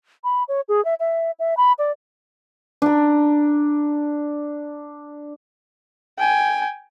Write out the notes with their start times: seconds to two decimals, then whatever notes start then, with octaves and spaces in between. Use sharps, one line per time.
0.24 B5
0.48 C#5
0.68 G#4
0.85 E5
1.00 E5
1.39 E5
1.57 B5
1.79 D5
2.82 D4 A#5
6.18 G5 G#5